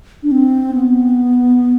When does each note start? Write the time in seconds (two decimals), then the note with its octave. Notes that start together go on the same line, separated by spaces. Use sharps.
0.23 D4
0.31 C4
0.74 B3